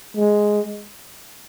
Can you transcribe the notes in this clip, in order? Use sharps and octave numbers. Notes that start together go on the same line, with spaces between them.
G#3